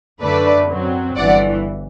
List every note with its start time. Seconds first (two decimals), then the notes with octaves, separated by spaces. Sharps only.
0.22 F#2 D3 A3 D4 B4 D5
0.70 F#2 F#3 C4
1.16 G1 G2 E3 D5 F#5